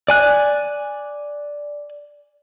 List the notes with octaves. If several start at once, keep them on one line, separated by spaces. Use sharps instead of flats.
D5 G#5 F#6